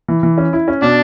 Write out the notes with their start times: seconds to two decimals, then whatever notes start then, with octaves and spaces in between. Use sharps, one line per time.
0.08 E3
0.23 E3
0.38 C#4
0.53 E4
0.68 C#4
0.82 B2 D4